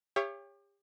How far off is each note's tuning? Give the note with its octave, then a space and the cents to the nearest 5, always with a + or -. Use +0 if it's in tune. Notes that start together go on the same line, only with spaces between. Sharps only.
G4 +35 C#5 +0 E5 +40